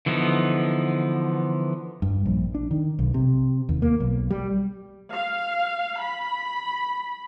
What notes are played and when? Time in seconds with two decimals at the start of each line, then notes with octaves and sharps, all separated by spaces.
0.06 D3 E3 F3 B3 D#4
2.02 G2
2.26 A#1
2.55 D4
2.71 D#3
2.99 B1
3.14 C3
3.69 D#2
3.82 A#3
4.00 B1
4.31 G3
5.12 F5
6.02 B5